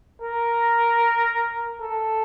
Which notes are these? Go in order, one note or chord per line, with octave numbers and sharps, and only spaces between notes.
A#4
A4